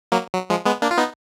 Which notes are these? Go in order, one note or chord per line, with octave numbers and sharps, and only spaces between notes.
F#3 A#3
F#3
F3 G#3
G#3 B3
A#3 D4
F4
B3 D#4